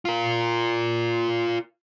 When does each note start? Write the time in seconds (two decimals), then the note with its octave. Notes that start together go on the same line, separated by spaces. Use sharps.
0.05 F4 A#4